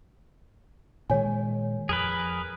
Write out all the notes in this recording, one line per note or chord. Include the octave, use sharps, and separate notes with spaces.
A#2 D#3 G#3 C#5 G#5
F2 G#4 A#4 B4